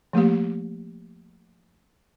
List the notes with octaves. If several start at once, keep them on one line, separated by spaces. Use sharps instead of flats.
F3 A3 A#3 G4